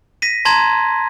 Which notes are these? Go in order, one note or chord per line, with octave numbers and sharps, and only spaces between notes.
A#6 B6 D#7
A5 A#5 C6 G#6